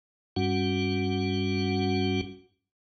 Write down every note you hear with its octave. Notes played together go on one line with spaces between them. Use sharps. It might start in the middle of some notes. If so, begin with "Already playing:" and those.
G2 G3 C#4 F#4 F#5